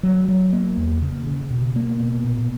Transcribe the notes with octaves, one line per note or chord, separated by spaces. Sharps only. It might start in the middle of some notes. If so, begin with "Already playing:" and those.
F#3
F#3
A#3
E2
C#3
C#3
B2
A#3
B2
A#2